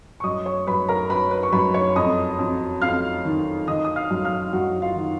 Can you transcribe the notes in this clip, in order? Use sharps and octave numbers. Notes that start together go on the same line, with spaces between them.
C#6
F#2 D#5 D#6
C#5 C#6
F#2 B4 B5
A#4 A#5
F#2 B4 B5
B4 B5
C#6
F#2 B4 B5
C#5 C#6
F2 D#5 D#6
F2
F2 F5 F6
D#3
D#3 D#5 D#6
D#6
F5 F6
F#2
F5 F6
F#2 F#4 F#5
F4 F5
D#3